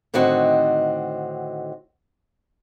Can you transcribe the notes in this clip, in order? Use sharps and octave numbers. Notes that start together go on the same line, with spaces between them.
A2 D3 D#3 C4 F#4 D#5